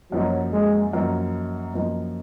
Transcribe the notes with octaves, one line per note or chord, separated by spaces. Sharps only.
F#2 F3 F#3 A#3 D#4
G#3
F#2 F3 A#3 D#4
F#2 F3 A#3 D#4